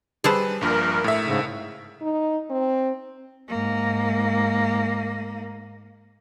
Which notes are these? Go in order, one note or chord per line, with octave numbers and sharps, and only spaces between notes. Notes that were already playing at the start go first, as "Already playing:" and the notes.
G3 G#4 A4 B4 C5
A#1 G2 A#2 A#4
A2 E5
G#2 C#3
D#4
C4
G#2 A#3